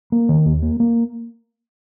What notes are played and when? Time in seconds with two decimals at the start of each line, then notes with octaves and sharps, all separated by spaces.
0.12 A#3
0.29 D#3
0.46 D#2
0.62 A#3
0.80 A#3